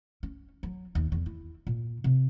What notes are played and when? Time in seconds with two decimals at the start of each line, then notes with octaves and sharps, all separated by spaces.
0.23 C#4
0.63 F#3
0.95 D#2
1.12 E2
1.26 E4
1.67 A#2
2.04 C3